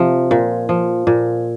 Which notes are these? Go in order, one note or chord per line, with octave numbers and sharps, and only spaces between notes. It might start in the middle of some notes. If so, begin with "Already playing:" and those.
Already playing: C3 F3
A#2
F3
A#2